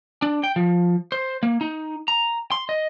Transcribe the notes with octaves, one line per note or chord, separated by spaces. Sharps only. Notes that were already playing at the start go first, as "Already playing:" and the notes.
D4
G5
F3
C5
A#3
D#4
A#5
C6
D#5